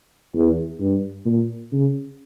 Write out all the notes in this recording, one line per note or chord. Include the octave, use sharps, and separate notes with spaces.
E2
G2
A#2
C#3